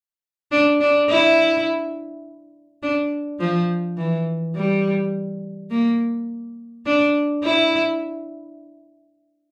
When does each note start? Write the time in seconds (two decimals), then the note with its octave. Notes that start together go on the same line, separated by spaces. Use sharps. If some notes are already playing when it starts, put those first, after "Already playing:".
0.52 D4
0.81 D4
1.09 E4
2.83 D4
3.40 F3
3.97 E3
4.55 G3
5.71 A#3
6.86 D4
7.44 E4